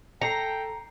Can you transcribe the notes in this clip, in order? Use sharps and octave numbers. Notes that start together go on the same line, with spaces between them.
A4 G5 A5 A#5 C7 C#7